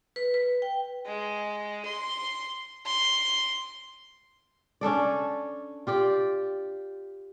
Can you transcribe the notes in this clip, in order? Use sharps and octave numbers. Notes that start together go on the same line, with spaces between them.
B4
B4
G5
G#3
C6
C6
C#4 D4 A4 D5
F4 G4 D5